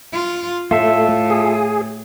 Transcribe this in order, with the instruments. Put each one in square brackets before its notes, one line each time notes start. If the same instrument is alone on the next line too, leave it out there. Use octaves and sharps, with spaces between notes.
[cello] F4
[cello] A2 [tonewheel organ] A3 [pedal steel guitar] F4 A4 E5
[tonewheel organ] G#4